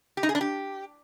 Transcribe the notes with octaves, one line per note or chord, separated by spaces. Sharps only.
G4
D#4
G#4
D4
G4